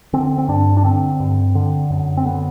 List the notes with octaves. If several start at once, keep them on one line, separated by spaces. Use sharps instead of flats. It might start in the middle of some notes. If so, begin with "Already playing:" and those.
D3 C4
C4
G2 D4
D4
D3 C4
G2
D3
F#2
C4
D3 B3